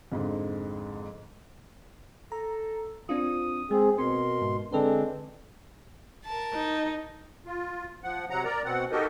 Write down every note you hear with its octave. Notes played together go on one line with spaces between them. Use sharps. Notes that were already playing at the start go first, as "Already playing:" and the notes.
F2 G#2 D3
A4 A#5
C4 D4 F4 D#6
G#3 C4 G#4
B2 C4 A#4 C6
G#2
D3 G#3 C4 D4 A4 B4
A#4 A5
D#4
F4
F3 F#5
C3 F#3 F#5 A#5
A#4 D5 A#5
B2 C4 F#5
D#4 F#4 G4 A4 A#4 D#5